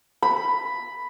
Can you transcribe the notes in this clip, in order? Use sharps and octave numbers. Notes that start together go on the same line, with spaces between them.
B5